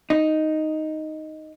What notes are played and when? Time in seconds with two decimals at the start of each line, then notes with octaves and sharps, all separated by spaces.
0.10 D#4